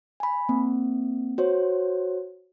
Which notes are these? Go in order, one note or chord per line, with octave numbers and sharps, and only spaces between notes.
G#5 B5
A#3 C4
F#4 C5 C#5